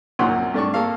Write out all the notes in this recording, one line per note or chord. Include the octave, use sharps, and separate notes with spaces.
C2 F#2 A#2 F#4 C6
G2 A3 D4 D5 C#6
A#3 A4 F5